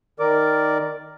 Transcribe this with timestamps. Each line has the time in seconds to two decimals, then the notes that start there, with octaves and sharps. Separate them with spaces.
0.19 D#3 A#4 D5 D6